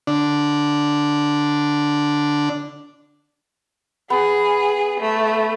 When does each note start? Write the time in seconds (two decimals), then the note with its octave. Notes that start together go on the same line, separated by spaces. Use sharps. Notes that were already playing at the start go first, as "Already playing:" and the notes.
0.07 D3 D4
4.10 B3 G#4
4.99 A3